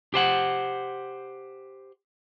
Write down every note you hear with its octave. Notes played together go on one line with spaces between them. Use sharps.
G4 C5 F#5